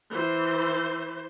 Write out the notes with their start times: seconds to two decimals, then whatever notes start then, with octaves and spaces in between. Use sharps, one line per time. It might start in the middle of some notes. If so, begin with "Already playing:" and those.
0.10 E3 C5